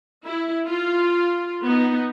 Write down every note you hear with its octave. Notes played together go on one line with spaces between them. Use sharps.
E4
F4
B3 D#4